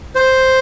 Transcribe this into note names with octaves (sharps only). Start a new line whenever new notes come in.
C5